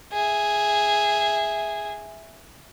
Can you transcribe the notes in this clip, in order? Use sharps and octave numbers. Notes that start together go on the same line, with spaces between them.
G#4 E5